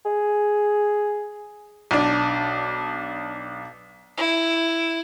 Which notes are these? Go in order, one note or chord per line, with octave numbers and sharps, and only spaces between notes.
G#4
B1 D4
E4